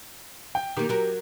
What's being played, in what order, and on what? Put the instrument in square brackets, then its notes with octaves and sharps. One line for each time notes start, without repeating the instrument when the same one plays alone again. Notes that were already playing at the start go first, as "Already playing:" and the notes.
[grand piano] G5
[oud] D#3 A#3 [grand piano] G4
[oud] F#3 A#4